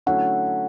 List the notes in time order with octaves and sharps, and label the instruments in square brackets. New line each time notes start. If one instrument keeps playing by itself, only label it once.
[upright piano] D3 F#3 A3 C#4 E4 [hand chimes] F#5